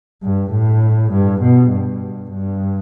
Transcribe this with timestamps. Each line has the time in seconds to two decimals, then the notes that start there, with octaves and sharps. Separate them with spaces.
0.22 G2
0.51 A2
1.11 G2
1.41 B2
1.70 G2
2.30 G2